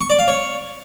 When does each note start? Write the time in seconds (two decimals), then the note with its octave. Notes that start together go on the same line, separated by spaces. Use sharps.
0.01 C#6
0.10 D5
0.19 F5
0.28 C#5